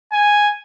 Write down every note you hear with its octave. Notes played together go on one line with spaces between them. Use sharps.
G#5